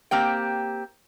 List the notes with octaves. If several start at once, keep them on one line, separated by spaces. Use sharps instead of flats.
A#3 C4 G4 G5